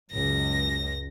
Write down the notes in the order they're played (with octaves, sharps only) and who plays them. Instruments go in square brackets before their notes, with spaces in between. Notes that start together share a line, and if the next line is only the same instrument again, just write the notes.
[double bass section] C#2 F#2 [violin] A#6